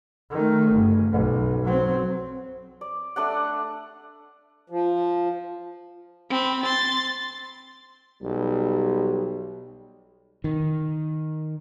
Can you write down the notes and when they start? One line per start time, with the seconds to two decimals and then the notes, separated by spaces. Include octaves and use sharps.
0.30 D#3 A3
0.71 G1 C#3
1.11 B1
1.64 F#3 C4
2.81 D5
3.16 A3 D4 D5 F#5
4.70 F3
6.30 C4 B5
6.63 C6 A6
8.22 B1 G3
10.44 D#3